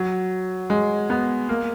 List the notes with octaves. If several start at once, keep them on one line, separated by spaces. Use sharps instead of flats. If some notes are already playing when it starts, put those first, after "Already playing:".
Already playing: F#3
G#3
B3
A#3